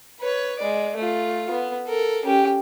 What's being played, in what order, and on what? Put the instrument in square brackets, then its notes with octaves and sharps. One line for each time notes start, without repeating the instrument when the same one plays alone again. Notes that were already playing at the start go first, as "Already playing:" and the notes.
[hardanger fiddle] B4 C#5
G#3 D5
A3 F4
B3
A4 A#4
C#4 G4